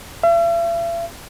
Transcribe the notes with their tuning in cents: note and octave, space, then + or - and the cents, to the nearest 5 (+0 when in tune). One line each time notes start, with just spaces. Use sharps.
E5 +45